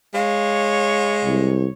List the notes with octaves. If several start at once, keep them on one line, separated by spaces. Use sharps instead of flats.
G#3 C#5 F5
C2